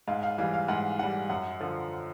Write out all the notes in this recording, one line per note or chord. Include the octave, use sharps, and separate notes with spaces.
G#2 F5
F5
E3 G3 F5
F5
G#2 F#5
E3 G3 F#5
F#2 F#5
D3 F3